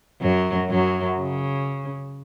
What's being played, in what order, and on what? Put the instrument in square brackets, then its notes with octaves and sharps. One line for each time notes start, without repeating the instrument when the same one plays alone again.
[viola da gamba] F#2 F#3
F#2 F#3
C#3